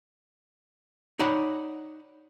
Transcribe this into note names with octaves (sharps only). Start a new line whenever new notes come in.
D#4 C#5 D5 F#5 B5